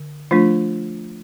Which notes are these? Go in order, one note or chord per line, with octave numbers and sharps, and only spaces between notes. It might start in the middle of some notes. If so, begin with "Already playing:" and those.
Already playing: D3
F3 A3 D4 F4